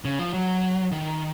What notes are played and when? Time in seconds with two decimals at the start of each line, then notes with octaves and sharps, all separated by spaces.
0.05 C#3
0.19 F3
0.34 F#3
0.92 D#3